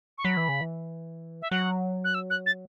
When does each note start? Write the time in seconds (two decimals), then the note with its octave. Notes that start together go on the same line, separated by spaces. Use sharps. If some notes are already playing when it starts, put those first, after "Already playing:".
0.18 C#6
0.25 F#3 B5
0.37 E3
0.49 C#3
0.61 E3
1.42 E5
1.51 F#3 F#5
2.04 F#6
2.14 E6
2.30 F#6
2.46 A6